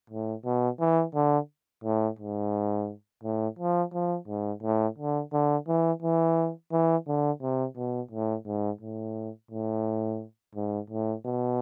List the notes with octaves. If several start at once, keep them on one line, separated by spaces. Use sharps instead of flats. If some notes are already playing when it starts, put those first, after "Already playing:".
A2
B2
E3
D3
A2
G#2
A2
F3
F3
G#2
A2
D3
D3
E3
E3
E3
D3
C3
B2
A2
G#2
A2
A2
G#2
A2
B2